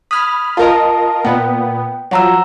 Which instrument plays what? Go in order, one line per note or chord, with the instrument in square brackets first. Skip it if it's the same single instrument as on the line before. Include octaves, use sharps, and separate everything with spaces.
[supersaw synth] B5 F6 [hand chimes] D#6 G#6
[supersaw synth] F4 A#4 D#5 [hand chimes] A5
[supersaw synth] A#2 B3 [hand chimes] G5
[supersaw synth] F3 F#3 [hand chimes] F#5 A#5 E6